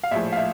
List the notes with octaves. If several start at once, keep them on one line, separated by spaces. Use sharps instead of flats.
F5
A#1 A2 F3 E5
F5
E5